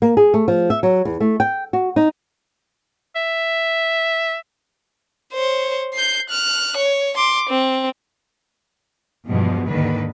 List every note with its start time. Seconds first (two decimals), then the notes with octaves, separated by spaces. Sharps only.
0.02 A#3
0.17 G#4
0.34 A3
0.48 F3
0.70 E5
0.83 F#3
1.05 E2
1.20 A3
1.40 G5
1.73 F#4
1.96 D#4
3.16 E5
5.34 C5 C#5
5.94 G6 C7
6.29 F6 F#6
6.77 C#5
7.17 C6 D6
7.50 C4
9.26 E2 G2 B2 F3 G#3
9.70 D#2 G#2 D3 D#3 B4